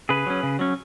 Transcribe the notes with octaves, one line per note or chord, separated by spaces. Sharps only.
C#3 G#4 B4
F#3 C#4
C#3
F#3 C#4